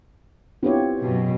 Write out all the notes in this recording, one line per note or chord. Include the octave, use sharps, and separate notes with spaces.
B3 C4 E4 F4 G4 C#5
F#2 B2